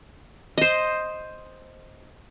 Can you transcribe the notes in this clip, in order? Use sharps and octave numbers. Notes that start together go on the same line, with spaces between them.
C5 D#5